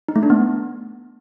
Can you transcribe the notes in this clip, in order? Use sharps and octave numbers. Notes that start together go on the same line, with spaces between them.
D#4
A3
D4
B3